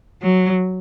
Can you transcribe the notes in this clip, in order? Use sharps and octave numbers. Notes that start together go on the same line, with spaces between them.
F#3